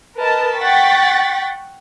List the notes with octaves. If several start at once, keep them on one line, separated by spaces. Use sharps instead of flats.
A#4 B4 D#5 A5
F#5 G5 C#6 A6 B6